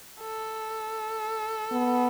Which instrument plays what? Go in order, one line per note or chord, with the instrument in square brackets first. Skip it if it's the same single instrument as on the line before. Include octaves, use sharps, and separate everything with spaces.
[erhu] A4
[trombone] B3